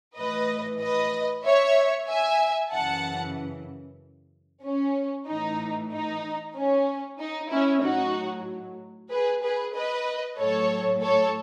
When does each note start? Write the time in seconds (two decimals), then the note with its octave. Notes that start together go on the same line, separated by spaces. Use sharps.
0.17 A2 E3 B4 D#5
0.81 B4 D#5
1.45 C#5 E5
2.09 E5 G#5
2.72 F#2 C#3 E3 F#5 A5
4.64 C#4
5.28 A2 E3 D#4
5.92 D#4
6.55 C#4
7.20 D#4
7.51 C#4 E4
7.83 A2 F#3 D#4 F#4
9.11 G#4 B4
9.43 G#4 B4
9.75 B4 D#5
10.38 A2 F#3 A4 C#5
11.03 A4 C#5